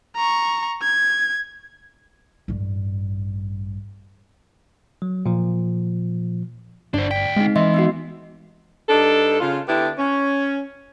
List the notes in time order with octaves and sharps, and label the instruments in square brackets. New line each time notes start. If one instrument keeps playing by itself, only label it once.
[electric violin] A#5 C#6
G#6
[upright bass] A1 G2
[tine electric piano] F#3
A#2 F3
[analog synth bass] G1 [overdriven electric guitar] D4 C5 [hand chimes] D5
[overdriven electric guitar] D2 G5 [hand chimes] B6
[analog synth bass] G#3 [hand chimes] C4 D#4
[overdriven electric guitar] E3 [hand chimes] D#5 E5 C6
[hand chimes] B3 D#4 F#4
[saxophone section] G2 D4 D#4 A4
C#3 F4
D3 B3 D4 E4 G4
C#4